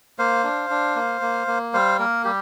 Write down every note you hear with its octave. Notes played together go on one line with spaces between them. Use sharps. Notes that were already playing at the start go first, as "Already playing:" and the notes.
A#3 C5 F5
D4
D4
A#3
A#3
A#3
G3 C5 F5
A#3 A#4
G3 G4